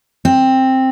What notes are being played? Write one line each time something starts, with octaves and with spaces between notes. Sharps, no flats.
C4